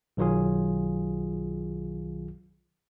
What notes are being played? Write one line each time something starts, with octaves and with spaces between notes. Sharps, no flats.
B1 D#3 F#3 F4 G#4